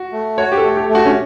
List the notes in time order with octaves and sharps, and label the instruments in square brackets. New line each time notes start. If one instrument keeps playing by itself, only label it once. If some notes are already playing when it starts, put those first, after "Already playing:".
Already playing: [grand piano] F#4
[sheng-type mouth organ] A3
[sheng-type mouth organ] F#4 [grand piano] C#5
[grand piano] G4
A4
[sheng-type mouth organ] A3
[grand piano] G4
[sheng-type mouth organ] A3
[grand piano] F#4
C#4